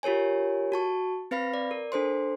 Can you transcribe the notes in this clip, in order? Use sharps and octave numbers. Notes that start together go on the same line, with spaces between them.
F4 G4 A#4 C#5 G#5
F#4 A5 C#6
C4 B4 F5 B5 A#6
D5
A#4
D4 A4 C5 C6